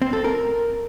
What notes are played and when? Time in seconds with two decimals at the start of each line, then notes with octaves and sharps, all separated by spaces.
0.02 C4
0.13 A4
0.24 A#4